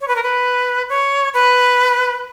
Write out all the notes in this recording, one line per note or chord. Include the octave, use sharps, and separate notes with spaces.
C#5
B4
A#4
B4
C#5
B4